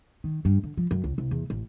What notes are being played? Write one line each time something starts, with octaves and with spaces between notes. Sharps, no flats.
D#3
G2
D3
F3
F#2
C#2
C2
E2
A1